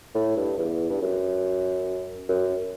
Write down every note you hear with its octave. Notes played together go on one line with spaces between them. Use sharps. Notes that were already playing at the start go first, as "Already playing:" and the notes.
A2
G2
E2
G2
F#2
F#2